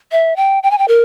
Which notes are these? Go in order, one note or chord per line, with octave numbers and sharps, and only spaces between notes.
E5
G5
G5
G#5
G5
A#4